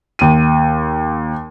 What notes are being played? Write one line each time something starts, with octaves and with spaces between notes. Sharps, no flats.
D#2 D#7